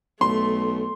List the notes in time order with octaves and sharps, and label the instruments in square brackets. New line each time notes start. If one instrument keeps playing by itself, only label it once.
[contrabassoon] B1 [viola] A3 [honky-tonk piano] C6